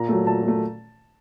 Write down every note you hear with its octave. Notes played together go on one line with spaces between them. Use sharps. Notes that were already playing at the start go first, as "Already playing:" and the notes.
Already playing: A#2 A#5
F#3 A3
A#2 A5
F#3 A3